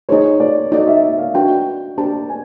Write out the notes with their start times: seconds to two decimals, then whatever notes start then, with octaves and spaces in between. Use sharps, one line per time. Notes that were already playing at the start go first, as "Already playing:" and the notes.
0.09 D#4 G#4 C5 C#5
0.40 D5
0.72 D#4 F#4 A4 D5 D#5
0.87 E5
1.03 E5
1.19 F5
1.34 D4 F#4 B4 G5
1.98 D4 G4 C5 A5
2.29 G#5